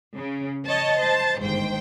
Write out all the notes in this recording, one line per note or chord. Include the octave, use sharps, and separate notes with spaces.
C#3
C#5 D#5 A5
C5 A5
G1 D#2 G#2 C5 G5